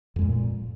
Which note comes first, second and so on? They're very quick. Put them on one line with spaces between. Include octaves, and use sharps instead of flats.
F2 G#3 A#2